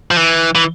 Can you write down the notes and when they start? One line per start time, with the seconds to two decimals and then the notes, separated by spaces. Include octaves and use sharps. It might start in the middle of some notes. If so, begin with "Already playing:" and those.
0.11 F3
0.17 E3
0.55 E3